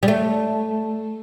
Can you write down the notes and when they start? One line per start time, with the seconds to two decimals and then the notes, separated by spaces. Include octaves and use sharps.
0.03 G3
0.08 A3